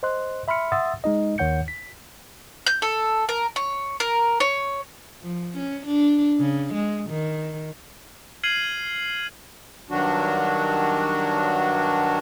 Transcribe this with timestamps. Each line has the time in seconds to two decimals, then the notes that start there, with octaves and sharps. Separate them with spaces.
0.03 C5 D#5 C6 F#6
0.48 E5 B5 C6 F6 C#7
0.72 E5 F#5 C6 D#6 E6 A6
1.04 G#3 D#4 D#5
1.38 D#2 D#3 C#5 F#5 G6 C#7
1.68 B6
2.66 G6
2.82 A4
3.29 A#4
3.56 C#5
4.00 A#4
4.40 C#5
5.22 F3
5.57 C#4
5.86 D4
6.39 C#3
6.73 G#3
7.09 D#3
8.43 F6 G#6 C7 D#7 F#7
9.90 G2 D#3 F#3 D4 F#4